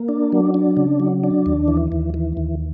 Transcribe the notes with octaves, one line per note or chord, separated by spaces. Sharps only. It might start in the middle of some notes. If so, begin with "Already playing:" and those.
Already playing: A#3
D4
F#3
D4
C#3
F#3
D4
D#2
E3
D#2
E3
D#2